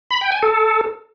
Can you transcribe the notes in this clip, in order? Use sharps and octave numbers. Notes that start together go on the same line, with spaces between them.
B5
G5
G#5
A4